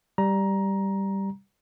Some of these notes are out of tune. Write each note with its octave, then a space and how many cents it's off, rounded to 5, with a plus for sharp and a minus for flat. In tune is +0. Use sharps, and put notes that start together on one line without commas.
G3 +0 A#5 +15